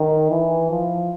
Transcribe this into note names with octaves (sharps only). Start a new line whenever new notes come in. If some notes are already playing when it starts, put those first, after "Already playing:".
Already playing: D#3
E3
F3